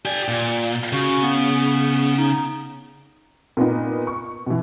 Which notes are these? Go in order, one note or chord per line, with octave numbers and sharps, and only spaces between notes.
G4 D5 G#5
A#2
C#3 F#4
B3
D#4
A#2 B3 D#4
C#6
B2 E3